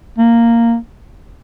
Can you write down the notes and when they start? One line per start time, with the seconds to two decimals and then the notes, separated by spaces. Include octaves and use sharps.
0.18 A#3